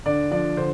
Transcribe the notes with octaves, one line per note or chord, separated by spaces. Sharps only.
D3 D4 D5
F3 D4 D5
D3 C5